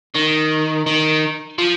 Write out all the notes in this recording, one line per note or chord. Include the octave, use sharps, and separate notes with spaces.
D#3
D#3
F3